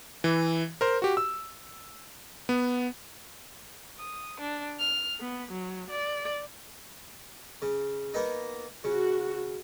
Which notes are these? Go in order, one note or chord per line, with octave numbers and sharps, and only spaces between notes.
E3
A#4 C5
F#4 G4
E6
B3
D#6
D4
F6
B3
F#3
D5
C#3
A#3 B3 D#4
C#3 F#4